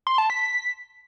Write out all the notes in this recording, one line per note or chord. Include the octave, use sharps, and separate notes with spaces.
C6
A5
B6